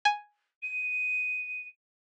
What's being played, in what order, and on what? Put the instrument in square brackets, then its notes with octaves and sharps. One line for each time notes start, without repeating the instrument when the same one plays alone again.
[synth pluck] G#5
[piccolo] D#7